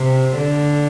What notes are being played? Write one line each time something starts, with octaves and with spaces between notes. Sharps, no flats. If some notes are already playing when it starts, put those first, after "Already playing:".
Already playing: C3
D3